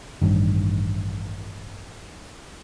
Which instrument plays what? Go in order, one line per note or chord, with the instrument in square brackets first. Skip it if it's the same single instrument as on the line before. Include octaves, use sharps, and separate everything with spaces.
[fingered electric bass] A1 G2 D#3